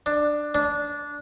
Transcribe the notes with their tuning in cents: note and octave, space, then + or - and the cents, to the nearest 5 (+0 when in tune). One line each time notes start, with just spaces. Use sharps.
D4 +10
D4 -15